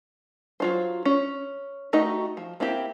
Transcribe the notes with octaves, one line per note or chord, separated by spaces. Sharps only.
F#3 F4 C5
C#4
A3 D#4 F#4 G4 D#5
F3
A#3 C4 E4 G4